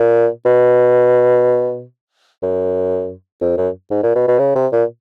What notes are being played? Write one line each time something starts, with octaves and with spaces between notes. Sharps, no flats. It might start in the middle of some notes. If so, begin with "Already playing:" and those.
Already playing: A#2
B2
F#2
F2
F#2
G#2
A#2
B2
B2
C#3
C3
A#2